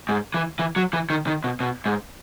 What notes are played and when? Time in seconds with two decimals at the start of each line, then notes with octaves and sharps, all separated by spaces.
0.09 G#2
0.34 E3
0.59 E3
0.76 F#3
0.93 E3
1.10 D#3
1.27 D#3
1.44 B2
1.60 B2
1.86 G#2